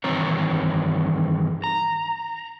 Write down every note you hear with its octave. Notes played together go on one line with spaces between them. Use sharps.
G2 D#3 E3 C4 C#5 A#5
A#5